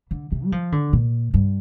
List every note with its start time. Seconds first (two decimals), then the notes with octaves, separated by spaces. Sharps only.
0.11 D3
0.32 C3
0.45 G3
0.52 F3
0.72 D3
0.93 A#2
1.34 G2